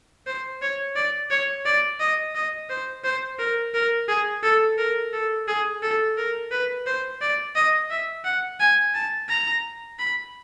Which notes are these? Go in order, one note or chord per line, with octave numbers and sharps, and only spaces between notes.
C5
C#5
D5
C#5
D5
D#5
D#5
C5
C5
A#4
A#4
G#4
A4
A#4
A4
G#4
A4
A#4
B4
C5
D5
D#5
E5
F#5
G#5
A5
A#5
B5